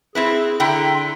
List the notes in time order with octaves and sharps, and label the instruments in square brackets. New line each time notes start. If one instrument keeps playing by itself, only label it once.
[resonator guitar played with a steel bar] C4 E4 B4 [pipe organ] G#4
[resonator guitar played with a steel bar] D3 E4 G5 [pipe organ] A#5 C6